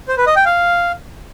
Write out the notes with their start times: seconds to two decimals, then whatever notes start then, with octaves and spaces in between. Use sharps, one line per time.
0.08 C5
0.17 B4
0.27 D#5
0.36 G5
0.45 F5